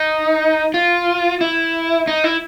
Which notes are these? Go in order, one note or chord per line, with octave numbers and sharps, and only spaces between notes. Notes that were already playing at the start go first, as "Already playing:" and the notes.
Already playing: D#4
F4
E4
D#4
E4